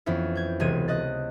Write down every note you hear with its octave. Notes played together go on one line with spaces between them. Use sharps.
F2 E3 B3 C#4 E4
G6 G#6
E1 C#2 C3 E3 G#6 D#7
D#5 F#6 A6